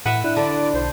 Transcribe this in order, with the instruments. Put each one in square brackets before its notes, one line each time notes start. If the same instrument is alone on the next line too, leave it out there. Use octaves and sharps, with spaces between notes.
[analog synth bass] A2 [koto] B4 E5 [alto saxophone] F#5
[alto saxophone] D4 [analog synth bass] E4 [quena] F#6
[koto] D3 [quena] D5
[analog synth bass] B1 [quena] C5